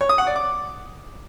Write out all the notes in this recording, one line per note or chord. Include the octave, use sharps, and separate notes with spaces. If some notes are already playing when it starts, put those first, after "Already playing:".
C#5
D#6
F#5
D5
D6